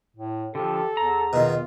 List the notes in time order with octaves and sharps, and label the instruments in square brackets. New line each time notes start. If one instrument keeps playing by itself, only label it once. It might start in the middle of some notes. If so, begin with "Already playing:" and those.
[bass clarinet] A2
[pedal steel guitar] D3 F3 [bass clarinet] G4 [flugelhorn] A4
[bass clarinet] E2 [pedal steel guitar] A#5
[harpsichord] B2 D#3 [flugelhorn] F4